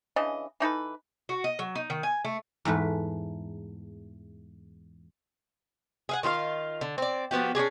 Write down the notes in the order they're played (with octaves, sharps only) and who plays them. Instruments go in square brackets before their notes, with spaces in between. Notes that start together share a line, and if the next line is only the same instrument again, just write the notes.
[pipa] C#3 E3 D4 D#5
E3 D#4 A4 B4
[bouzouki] F#4
D#5
F#3
D#4
D#3
G#5
A3
[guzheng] E2 G#2 A3 B4
[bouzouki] G#4 F5 F#5
D#3 F4 G#4 F5
D3
C4 D5
F3 B3 F#4 G4
C#4 D4 G4 G#4